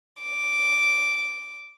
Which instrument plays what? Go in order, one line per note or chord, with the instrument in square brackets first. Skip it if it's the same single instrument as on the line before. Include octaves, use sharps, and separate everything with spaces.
[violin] D6